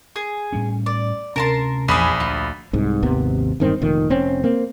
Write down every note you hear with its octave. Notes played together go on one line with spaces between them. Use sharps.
G#4
A2 G3 C#4
D5
D2 C3 C#4 A#4 A5 C6
A#1 E2 D4 G#4 B5 D#6
D2 F4
C2 G#2
G#1 D#2 C3 B3
E1 G2 D#3 C4
F1 A#2 D#3
F1 C4 C#4
A#3 C4